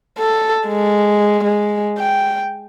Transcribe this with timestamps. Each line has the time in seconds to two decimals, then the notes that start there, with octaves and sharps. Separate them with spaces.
0.19 A4
0.68 G#3
1.44 G#3
1.99 G5